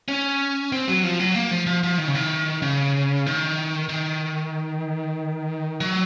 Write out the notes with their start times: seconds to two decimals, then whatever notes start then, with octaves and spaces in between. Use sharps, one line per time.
0.08 C#4
0.72 C4
0.88 F#3
1.04 F3
1.20 F#3
1.35 A#3
1.51 F3
1.67 F3
1.83 F3
1.98 D#3
2.07 C#3
2.15 D#3
2.62 C#3
3.26 D#3
3.89 D#3
5.80 F#3